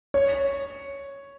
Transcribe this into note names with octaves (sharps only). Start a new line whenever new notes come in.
C#5